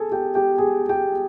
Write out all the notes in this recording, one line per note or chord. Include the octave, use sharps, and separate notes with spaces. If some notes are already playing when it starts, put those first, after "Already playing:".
Already playing: G#4 A4 G#5 A5
G4 G5
G4 G5
G#4 G#5
G4 G5